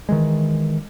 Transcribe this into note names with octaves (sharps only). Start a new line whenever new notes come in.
D#3 E3 G#3